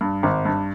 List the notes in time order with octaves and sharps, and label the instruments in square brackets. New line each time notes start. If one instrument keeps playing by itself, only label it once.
[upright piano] G2
G#1
G2